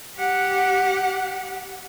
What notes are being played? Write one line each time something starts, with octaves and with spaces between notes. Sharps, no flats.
G4 F#5